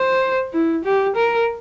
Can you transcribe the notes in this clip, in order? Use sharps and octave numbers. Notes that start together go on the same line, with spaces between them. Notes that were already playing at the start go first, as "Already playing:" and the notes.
Already playing: C5
E4
G4
A#4